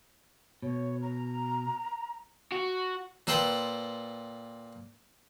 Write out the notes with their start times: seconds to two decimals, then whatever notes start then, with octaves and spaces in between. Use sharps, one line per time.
0.62 B2 C#5
1.02 A#5
2.52 F#4
3.27 A#2 A4 B4 C5 G5